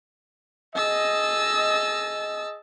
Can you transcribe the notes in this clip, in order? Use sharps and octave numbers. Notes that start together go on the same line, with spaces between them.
G#4 D#5 A5 E6